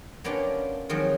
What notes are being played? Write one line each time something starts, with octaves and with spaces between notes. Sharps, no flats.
A#3 B3 C#4 D4 F4 G4
D#3 F3 F#3 G#3 C4 C#4